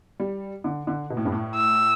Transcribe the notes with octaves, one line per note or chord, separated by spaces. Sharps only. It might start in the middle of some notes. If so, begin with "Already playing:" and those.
G3
D3
D3
B2
A2
G2
A2
E6